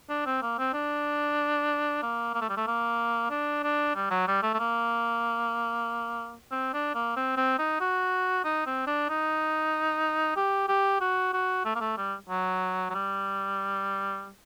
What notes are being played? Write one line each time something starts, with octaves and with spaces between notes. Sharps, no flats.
D4
C4
A#3
C4
D4
A#3
A#3
A3
G3
A3
A#3
D4
D4
G3
F#3
G3
A3
A3
A#3
C4
D4
A#3
C4
C4
D#4
F#4
D#4
C4
D4
D#4
G4
G4
F#4
F#4
A3
A#3
A3
G3
F#3
F#3
G3